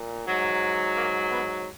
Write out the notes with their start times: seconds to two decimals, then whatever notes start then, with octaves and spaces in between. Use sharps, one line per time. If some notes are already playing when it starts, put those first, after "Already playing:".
Already playing: A#2
0.27 G#2 F#3
0.96 A#3
1.31 B3